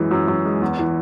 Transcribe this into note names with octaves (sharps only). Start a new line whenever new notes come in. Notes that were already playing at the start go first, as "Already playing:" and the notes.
Already playing: F#2 E3 G#3
F#2
F#2
G#3
E2
E3